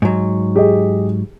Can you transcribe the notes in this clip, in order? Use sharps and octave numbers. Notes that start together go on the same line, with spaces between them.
G#2 F#3
G4 G#4 D#5